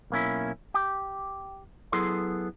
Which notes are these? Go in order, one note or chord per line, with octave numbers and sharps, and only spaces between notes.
B1 A#3 C#4 E4
G4
F#3 B3 E4 G#4 A4 C6